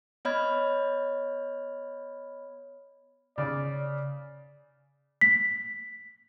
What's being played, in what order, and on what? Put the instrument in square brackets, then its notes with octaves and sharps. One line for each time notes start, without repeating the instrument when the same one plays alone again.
[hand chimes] B3 C#5 D#5 B5 F6 G#6
[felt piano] C#3 [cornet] D5
[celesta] B6